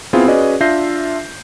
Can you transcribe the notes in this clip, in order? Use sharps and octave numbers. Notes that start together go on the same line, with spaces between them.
B3 C4 E4 F4 G#4
C#4 F#4 G#4 B4 D5 D#5
D4 F4 E5 G6 A#6 C7